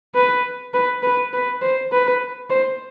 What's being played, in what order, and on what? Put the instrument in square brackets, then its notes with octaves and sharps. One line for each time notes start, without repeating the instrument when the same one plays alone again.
[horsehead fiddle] B4
B4
B4
B4
C5
B4
C5